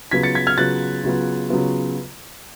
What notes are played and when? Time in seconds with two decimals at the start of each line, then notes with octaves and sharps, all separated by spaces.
0.11 C#3 F#3 B3 F4 G#6 B6
0.23 A6 C#7
0.35 G#6 B6
0.47 F6 G#6
0.58 C#3 F#3 B3 F4 F#6 A6
1.04 C#3 F#3 B3 F4
1.50 C#3 F#3 B3 F4